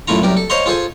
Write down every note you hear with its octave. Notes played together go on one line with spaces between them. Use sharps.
F#2 A3 E4 F4 A#5
C2 F#2 G4 A#4
A4
C5 C#5 D#5 F5 A#5 C6
F4 G#4 A4 C5 G#5